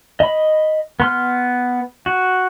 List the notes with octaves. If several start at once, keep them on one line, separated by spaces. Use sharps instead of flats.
D#5 B5
B3 C6 F6
F#4